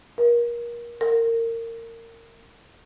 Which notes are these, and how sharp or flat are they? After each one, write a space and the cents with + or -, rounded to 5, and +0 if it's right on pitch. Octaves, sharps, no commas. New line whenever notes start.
A#4 +30
A#4 -25